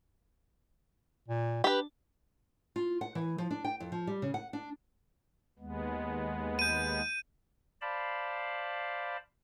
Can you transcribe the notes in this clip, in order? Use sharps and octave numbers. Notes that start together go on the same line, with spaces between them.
A#2
D4 G4 B4
F4
F#5
E3
F3
D4
G5
F2
F3
G3
C#3
F#5
D4
D#2 G#3 B3
G6 D#7
C5 D5 F5 A5 B5